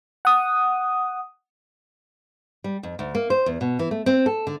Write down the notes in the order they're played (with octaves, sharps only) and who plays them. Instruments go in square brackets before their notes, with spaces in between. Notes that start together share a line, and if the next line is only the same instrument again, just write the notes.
[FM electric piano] F#5 D#6
[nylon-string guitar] G3
F2
D2
A#3
C5
E2
B2
E3
A3
C4
A4
D3